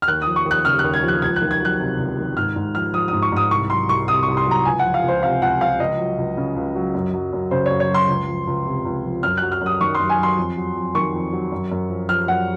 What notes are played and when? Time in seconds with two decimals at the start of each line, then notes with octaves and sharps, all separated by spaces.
0.02 F6
0.08 D#2 F#6
0.22 D#6
0.27 F3
0.36 C#6
0.46 D#2
0.51 F#6
0.65 C#3 F6
0.79 F#6
0.84 D#2
0.94 G#6
1.03 F3 F#6
1.22 C#2 G#6
1.36 F#6
1.42 D#3
1.51 G#6
1.60 F#3 F#6
1.79 C3
1.98 C#2
2.18 D#3
2.37 G#2 F6
2.56 G#2
2.75 F3 F6
2.94 F3 D#6
3.08 G#2 D#6
3.22 C#6
3.32 G#2 D#6
3.51 C2 C#6
3.70 F#3 C6
3.89 C2 C#6
4.08 C3 D#6
4.23 C2 C#6
4.37 C6
4.46 F#3 A#5
4.65 C#2 G#5
4.79 F#5
4.84 F3
4.94 F5
5.04 C#2 C5
5.23 C3 F5
5.41 C#2 F#5
5.61 F3 F5
5.80 C#2 D#5
5.99 F#3
6.18 C#2
6.37 C#3
6.56 C#2
6.75 F#3
6.94 F#2
7.14 F#3
7.33 F#2
7.51 C#3 C5
7.66 F#2 C#5
7.80 C#5
7.90 F#3 C6
8.09 C#2
8.28 F3
8.47 C#2
8.66 C3
8.85 C#2
9.04 F3
9.23 F#2 F6
9.37 F#3 F#6
9.52 F6
9.61 F#2 D#6
9.80 D#3 C#6
9.95 F#2 C6
10.09 G#5
10.18 F#3 C6
10.37 F2
10.57 F#3
10.76 F2
10.95 D#3 C#6
11.14 F2
11.32 F#3
11.52 F#2
11.71 F#2
11.90 F3
12.09 F3 F6
12.28 F#2 F#5